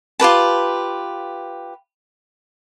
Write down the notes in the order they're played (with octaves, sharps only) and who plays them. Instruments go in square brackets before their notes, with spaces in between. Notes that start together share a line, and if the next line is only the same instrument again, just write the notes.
[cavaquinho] F4 G4 B4 A5